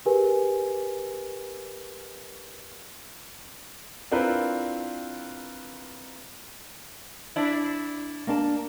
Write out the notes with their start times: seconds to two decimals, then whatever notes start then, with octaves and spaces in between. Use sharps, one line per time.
0.06 G4 G#4 A#4 B4 G#5
4.11 C4 D4 E4 F4 A#4 B4
7.36 D4 E4
8.27 A#3 D4 A5